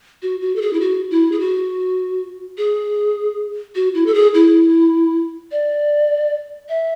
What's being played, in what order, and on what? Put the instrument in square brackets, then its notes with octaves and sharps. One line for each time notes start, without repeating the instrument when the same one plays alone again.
[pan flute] F#4
F#4
A4
G#4
E4
F#4
E4
G#4
F#4
G#4
F#4
E4
A4
G#4
E4
D5
E5